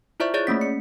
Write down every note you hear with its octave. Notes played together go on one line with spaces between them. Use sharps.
E4 F4 C5 D5 E5 C#6
G#4 C#5 D5 A6
A3 A#3 C#4 B6
C#7